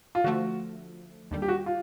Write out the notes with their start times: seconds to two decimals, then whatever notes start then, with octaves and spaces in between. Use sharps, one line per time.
0.15 F4
0.24 D3 F3 A3 F#4
1.31 D#2 D3 G3
1.42 G4
1.48 F#4
1.66 F4